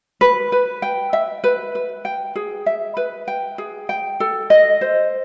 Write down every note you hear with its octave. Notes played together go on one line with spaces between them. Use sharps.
B4
B4
G5
E5
B4
B4
G5
G#4
E5
B4
G5
G#4
G5
A4
D#5
C5